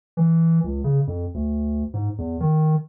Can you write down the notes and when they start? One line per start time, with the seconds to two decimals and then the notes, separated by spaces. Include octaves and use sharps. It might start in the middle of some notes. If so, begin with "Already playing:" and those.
0.17 E3
0.64 C#2
0.84 C#3
1.07 F2
1.34 D2
1.94 G#2
2.18 E2
2.40 D#3